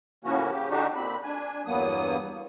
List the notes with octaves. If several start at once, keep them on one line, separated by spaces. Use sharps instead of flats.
A2 C#3 F3 A#3 C#4 F#4
C#3 G4
D3 D4 D#4 F#4 G4
A#2 C4 B5
D4 G#5
E2 G2 F#3 A#3 B3 D#6